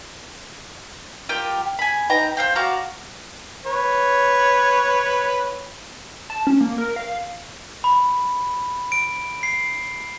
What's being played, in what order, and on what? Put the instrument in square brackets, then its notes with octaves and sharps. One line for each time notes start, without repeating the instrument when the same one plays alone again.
[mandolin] F4 G4 A#4 G5
G#5 B5
D#4 B4 G5 A#5
C5 F5 G5
F#4 D5 F5 A#5
[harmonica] B4 C#5
[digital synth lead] A5
C#4
A#3
A#4
F5
[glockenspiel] B5
D7
C7